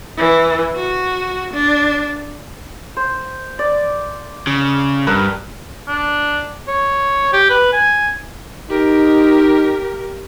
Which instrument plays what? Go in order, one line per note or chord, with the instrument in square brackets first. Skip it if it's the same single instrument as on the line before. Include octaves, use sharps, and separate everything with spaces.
[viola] E3
F#4
D4
[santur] C5
D5
[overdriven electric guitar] C#3
[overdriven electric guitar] G2 [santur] A#4 B4
[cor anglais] D4
C#5
G4
B4
G#5
[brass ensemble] D#4 [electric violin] G4 A#4